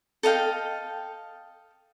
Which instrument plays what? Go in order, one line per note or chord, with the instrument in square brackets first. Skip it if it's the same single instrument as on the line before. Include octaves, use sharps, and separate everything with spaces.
[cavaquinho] A4 D#5 F5 G5